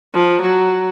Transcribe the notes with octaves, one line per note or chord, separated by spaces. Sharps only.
F3
F#3